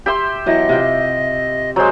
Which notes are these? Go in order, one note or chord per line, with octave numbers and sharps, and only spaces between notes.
G4 E5 C6
E3 F#3 B3 D#5
C3 F4 G5
F#3 G#3 C5